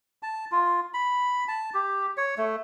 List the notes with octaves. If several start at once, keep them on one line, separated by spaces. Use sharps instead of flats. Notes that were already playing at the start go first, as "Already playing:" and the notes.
A5
F4
B5
A5
G4
C#5
A3